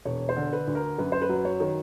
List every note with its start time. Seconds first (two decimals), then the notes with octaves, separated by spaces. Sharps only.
0.05 E1 C#5
0.29 C5
0.37 D3
0.53 B4
0.68 D2
0.75 A#4
0.98 F#2 B4
1.12 C5
1.22 B4
1.29 F#3
1.45 C#5
1.60 D#3